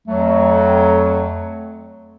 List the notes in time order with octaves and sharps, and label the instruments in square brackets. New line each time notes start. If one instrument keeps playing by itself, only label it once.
[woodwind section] F2 F#3 [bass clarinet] A3